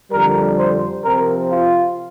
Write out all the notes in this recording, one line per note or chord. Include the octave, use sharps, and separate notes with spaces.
F2 D3 G3 A#4
C5
C3 F3 C4 A#4
F4